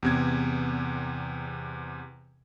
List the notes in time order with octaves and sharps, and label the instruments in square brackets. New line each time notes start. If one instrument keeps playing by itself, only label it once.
[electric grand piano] E2 C3 G#6